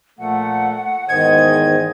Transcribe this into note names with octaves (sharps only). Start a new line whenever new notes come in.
A#2 F3 A3 F#5
E2 G#2 D#3 G#4 C5 D#5 G#6